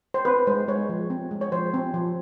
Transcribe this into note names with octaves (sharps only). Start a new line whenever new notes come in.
C5
C4 B4
G#3 C5
G#3 C#5
F3
C4
G#3
C#5
F3 C5
C4
F3